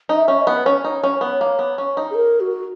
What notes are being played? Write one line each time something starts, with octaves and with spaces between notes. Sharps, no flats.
D#4
E5
C#4
D#5
B3
B4
C#4 C#5
D#4
C#4
B3
A#3
B3
C#4
D#4
G#4
A#4
F#4